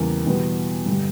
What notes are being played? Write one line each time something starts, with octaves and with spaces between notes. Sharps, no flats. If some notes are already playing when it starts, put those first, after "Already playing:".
Already playing: E2 C#3 G3 A#3
E2 B2 G3 B3
G2 D3 G3